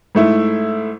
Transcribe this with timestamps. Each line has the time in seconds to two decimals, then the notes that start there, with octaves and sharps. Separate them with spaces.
0.15 G#2 A3 E4